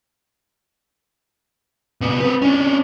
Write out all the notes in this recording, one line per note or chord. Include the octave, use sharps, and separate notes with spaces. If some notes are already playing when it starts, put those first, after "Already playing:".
A#2 B3
C4 B4
C#4 D4